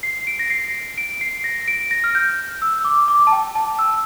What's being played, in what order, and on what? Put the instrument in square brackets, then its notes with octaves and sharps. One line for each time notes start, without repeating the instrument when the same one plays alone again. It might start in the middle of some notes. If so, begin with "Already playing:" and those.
[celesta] C7
D7
A#6
C7
D7
C7
A#6
D7
A#6
F6
G6
E6
D6
D6
A5
G5
A5
E6